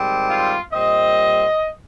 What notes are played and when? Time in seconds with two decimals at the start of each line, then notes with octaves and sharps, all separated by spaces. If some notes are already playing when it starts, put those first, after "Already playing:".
Already playing: G#2 D#3 G3 C4
0.28 F4
0.72 A#2 G3 C4 D#5